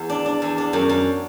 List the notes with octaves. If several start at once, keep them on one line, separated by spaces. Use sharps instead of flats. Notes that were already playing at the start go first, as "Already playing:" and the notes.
Already playing: E2
D4
D4
E2
D4
F#2
F#2